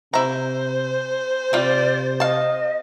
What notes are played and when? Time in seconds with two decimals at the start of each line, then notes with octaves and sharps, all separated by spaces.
0.14 C3 E4 C5 A#5
1.53 C3 G3 F4 D5
2.20 D#5 F5 A5